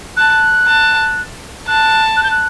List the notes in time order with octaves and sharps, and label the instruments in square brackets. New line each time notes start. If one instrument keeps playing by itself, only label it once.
[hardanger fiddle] A5 [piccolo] F#6
[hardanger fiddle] A5
[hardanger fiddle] A5 [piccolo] F#6
[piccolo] F#6
G6
F#6